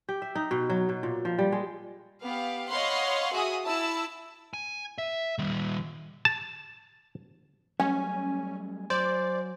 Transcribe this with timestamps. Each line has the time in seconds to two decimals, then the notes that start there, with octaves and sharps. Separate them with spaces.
0.09 G4
0.22 E5
0.35 D#4
0.51 B2
0.70 F#3
0.89 B2
1.03 A#2
1.25 F3
1.39 G3
1.52 G#3
2.23 B3 G4 F5
2.69 C#5 D#5 F5 F#5 B5 C6
3.32 F#4 G#4 E5 G#5 D#6
3.66 E4 A5 E6
4.53 G#5
4.98 E5
5.38 D#3 G3
6.25 A5
7.80 F#3 G3 A3 C#4 G#5
8.90 F#3 C5 D5